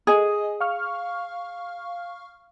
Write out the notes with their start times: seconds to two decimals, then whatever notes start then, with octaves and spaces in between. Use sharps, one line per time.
0.07 G#4 D#5 G#5 D#6
0.60 F5 C#6 F6